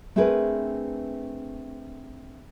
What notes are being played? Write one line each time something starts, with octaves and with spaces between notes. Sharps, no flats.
A3 C4 D4 G#4 A#4 B4